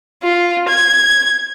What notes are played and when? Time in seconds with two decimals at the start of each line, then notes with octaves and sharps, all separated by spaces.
0.23 F4
0.68 G#6